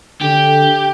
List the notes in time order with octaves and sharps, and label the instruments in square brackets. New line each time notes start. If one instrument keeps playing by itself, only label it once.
[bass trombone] D3 [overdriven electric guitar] G4